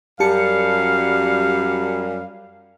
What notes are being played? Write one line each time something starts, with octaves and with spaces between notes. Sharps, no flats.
F#2 G3 G4 F5 A5 C#7